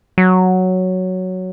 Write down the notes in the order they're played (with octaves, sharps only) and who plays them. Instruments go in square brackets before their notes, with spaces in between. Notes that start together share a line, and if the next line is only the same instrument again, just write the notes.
[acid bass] F#3